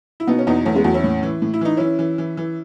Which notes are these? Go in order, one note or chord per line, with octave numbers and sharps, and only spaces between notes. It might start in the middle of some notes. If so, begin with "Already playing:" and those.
E4
B2 B3 D#4
C#4
E2 B3 D#4
E2 A3 C#4
G#3 B3
E2 F#3 A3
C#4 E4
A2
E3
A2
E4
E3 D#4
E3 C#4 E4
E3
E3
E3